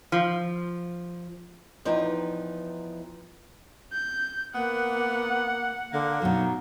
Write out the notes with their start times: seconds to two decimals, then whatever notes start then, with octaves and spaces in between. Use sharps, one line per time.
0.12 F3
1.85 E2 F3 D#4 B4 G5
3.93 G6
4.55 A#3 B3 F#5
5.92 D3 A#3
6.22 B2 F#3 D#4